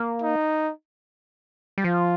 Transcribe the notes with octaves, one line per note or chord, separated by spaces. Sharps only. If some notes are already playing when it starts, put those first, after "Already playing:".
Already playing: A#3
D#4
G3
F3 F4